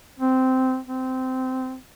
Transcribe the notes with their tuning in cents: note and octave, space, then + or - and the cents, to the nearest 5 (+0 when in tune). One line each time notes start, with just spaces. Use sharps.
C4 -10
C4 -15